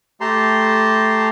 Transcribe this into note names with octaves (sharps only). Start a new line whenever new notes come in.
A3 G4 A5 A#5 C6